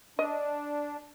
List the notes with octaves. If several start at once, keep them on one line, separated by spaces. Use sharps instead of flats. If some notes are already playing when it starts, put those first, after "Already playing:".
D4 D#5